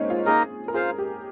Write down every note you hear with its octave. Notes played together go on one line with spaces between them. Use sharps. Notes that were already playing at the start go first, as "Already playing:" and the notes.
Already playing: G#3 A#3 C4 C#4 D#4
F4
A#3 D#4 G#4 A#4 D#5
A#4
F4 G#4 C5 F5
G4